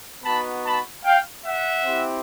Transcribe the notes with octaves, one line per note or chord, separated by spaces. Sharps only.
B3 D#4 F#4 A5 B5
A5 B5
F5 G5
E5 F#5
C4 E4 G4